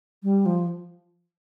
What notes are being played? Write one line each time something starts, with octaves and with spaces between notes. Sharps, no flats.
G3
F3